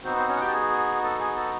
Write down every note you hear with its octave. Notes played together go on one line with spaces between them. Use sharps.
B3 C4 D#4 F#4 C5
C4 C5
C#4 C#5
F#5
G4 G5
A5
G#4 G#5
A4 A5
G#4 G#5
A4 A5